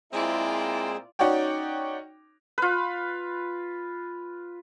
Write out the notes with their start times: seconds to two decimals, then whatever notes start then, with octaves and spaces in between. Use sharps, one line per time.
0.13 A#2 G#3 C4 E4 F4 G#4 D5
1.19 C#4 D#4 F#4 C#5 D5 G5
2.58 F4 B4